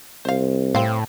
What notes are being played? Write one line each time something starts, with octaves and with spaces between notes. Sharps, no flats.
C2 C5 F5
A2 C4 F5